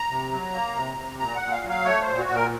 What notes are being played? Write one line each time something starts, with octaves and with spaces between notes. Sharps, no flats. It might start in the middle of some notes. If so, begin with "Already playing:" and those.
Already playing: A#5
C3
F#3
A#3
C3
C3
A#2 A#5
F#5
A#2
F5
F#3
F5
A3 C#5
C5
A#2
F#4
A#2
A#4